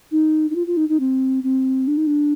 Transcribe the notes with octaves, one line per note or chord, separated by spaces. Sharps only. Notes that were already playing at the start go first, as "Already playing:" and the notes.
D#4
D#4
F4
F4
D#4
D#4
C4
C4
D4
D#4
D4